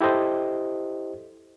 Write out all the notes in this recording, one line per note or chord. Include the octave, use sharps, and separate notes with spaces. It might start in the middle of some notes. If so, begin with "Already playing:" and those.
E4 G4 A4 C5 D#5